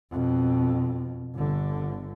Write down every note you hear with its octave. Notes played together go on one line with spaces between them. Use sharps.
F2 B2
G1 D3